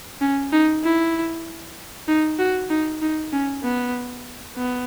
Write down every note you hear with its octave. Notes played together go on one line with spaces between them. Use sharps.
C#4
D#4
E4
D#4
F#4
D#4
D#4
C#4
B3
B3